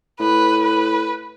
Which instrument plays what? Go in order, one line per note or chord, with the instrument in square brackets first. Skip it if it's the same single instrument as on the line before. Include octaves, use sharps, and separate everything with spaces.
[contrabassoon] A2 [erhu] B4
[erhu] B4